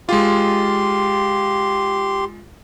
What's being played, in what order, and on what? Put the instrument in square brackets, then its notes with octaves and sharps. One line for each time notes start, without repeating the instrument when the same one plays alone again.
[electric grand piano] G#3 F4 [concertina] G4 C6